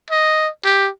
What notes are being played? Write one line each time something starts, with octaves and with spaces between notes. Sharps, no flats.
D#5
G4